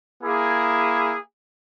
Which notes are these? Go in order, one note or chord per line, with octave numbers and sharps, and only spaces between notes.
A#3 E4 G#4